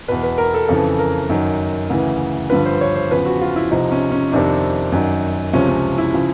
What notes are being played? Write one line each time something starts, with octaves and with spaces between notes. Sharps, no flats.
E2 B2 B4
B4
A#4
A4
F2 C#3 E3 A4
A#4
F#2 D#3
D2 C#3 E3
G2 D3 F3 B4
C5
C#5
C5
E2 C#3 F3 B4
F#4
F4
E4
C2 C3 F3 D#4
C#4
C#4
F2 C3 D#3 D4
F#2 D#3
C#2 C3 F3 C#4
C#4
E4
C#3 F3